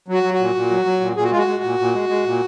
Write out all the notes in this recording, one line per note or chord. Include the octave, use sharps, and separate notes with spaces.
F#3
F#4
F#3
F#4
A#2
A#2
F#3
F#3
A#2
A#2 G#4
F#4
G#3 F4
F#4
G#3
A#2
A#2
G#3
G#3
A#2